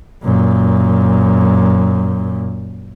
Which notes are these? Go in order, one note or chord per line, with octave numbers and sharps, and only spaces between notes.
F#2 A#2